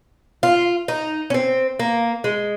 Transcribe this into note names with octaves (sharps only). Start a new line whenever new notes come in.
F4
D#4
C#4
C4
A#3
G#3